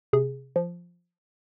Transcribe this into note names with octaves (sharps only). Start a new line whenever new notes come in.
C3 G#4
F3